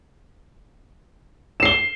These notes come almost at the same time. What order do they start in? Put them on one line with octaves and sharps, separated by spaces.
E7 C7 G7